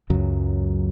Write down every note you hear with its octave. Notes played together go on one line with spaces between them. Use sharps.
C#2 F#2 C#3 F#3